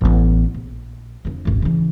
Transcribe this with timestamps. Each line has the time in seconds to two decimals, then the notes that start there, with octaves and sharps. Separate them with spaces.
0.01 A1 B3
0.55 A#1
1.25 F2 D3
1.45 D#1 G#1
1.62 C#3 E3